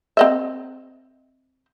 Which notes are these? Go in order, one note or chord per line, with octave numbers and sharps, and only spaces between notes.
C4 D#5 E5